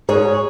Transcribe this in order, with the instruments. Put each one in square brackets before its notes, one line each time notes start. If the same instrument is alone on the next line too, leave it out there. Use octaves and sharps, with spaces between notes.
[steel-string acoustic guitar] G#2 G#4 C#5